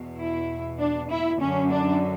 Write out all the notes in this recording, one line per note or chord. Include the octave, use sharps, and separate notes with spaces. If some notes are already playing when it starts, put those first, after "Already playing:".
Already playing: E2 B2
E4
D4
E4
F#2 D3 C#4
D4